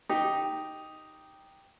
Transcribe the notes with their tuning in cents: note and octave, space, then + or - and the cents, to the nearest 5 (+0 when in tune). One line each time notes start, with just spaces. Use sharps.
D#4 +0 G4 +0